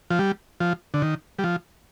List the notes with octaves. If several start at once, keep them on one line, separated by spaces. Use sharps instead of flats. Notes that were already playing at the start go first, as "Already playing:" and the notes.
F3
G3
F3
D3
D#3
G3
F3